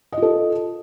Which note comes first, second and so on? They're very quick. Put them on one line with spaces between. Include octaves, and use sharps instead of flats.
D#5 F4 A4